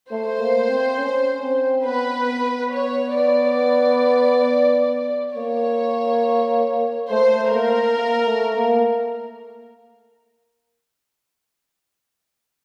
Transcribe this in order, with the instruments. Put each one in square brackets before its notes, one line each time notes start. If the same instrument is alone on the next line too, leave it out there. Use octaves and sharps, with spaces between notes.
[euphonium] A3 [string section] C5
[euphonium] A#3
C4
C#4
C4
[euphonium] B3 [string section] B4
[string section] C#5
D5
[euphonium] A#3 [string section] C#5
[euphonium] A3 [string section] C5
[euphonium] A#3 [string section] A#4
[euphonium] A#3
A3
A#3